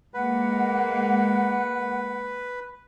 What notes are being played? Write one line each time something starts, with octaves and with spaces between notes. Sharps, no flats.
G#3 A#3 B4 F#5